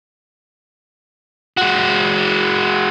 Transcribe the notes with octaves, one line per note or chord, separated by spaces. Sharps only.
G#3 F#4